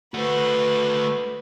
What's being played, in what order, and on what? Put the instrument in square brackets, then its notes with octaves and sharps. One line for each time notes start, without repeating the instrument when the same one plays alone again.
[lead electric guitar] A3 F#4 [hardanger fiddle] B4 C5